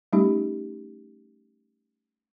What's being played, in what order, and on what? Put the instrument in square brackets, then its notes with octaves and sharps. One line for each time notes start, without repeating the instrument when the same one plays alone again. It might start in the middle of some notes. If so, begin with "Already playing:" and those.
[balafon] G3 A3 C#4 D#4 G4